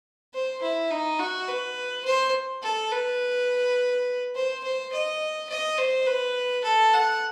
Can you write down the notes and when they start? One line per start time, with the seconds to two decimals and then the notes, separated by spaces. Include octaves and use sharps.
0.34 C5
0.62 E4
0.90 D#4
1.19 F#4
1.48 B4
2.05 C5
2.63 A4
2.92 B4
4.35 C5
4.64 C5
4.92 D#5
5.49 D#5
5.78 C5
6.07 B4
6.64 A4
6.93 F#5